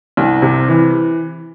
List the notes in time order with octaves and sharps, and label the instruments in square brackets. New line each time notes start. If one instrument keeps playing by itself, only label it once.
[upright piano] C2
C3
E3